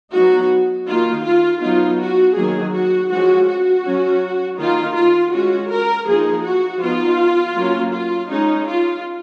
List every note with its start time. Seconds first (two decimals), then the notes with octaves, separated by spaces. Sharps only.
0.14 F#3 B3 D#4 F#4
0.87 D#3 A#3 D#4 F4
1.25 F4
1.62 F#3 B3 D#4 F4
2.00 F#4
2.36 D#3 F#3 A#3 D#4 G#4
2.73 F#4
3.11 F3 G#3 C#4 F#4
3.48 F#4
3.85 F#3 C#4
4.59 D#3 A#3 D#4 F4
4.96 F4
5.33 G#3 C#4 F#4
5.71 A#4
6.07 F3 A#3 D#4 G#4
6.44 F#4
6.82 F3 B3 D#4 F4
7.56 F#3 A#3 C#4
7.93 F4
8.31 G#3 C#4 D#4
8.68 F4